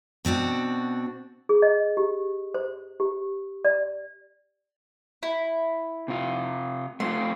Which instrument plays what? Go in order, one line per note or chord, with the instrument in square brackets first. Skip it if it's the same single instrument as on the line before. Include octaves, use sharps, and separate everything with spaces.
[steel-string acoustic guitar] B2 C4 D4 F#4
[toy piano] G#4
D#5
G4
C5
G4
D5
[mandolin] E4
[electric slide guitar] C3 F4
[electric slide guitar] A3 C4 F4 [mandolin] C6